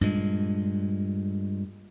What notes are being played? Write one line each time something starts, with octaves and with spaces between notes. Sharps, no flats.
G2 A#2 G#3